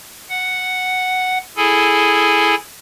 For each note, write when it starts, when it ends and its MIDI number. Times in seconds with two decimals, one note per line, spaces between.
0.29 1.38 78
1.57 2.55 64
1.57 2.55 68
1.57 2.55 69
1.57 2.55 80